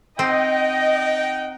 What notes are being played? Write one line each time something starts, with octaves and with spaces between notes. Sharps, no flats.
C4 D#4 D#5 F#5 G5